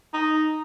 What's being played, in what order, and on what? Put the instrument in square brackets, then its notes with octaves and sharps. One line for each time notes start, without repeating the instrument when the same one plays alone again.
[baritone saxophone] D#4